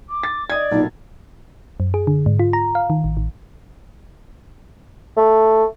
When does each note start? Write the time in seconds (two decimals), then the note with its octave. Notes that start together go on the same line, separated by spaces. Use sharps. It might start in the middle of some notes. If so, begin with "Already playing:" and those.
0.10 D6
0.23 A6
0.50 D5 D#5 D#6 G#6
0.71 B1 A#2 D#4
1.80 F#2
1.94 G#4
2.07 D3
2.26 G#2
2.39 F4
2.53 A#5
2.75 F5
2.90 D#3
3.04 A1
3.17 A1
5.17 A3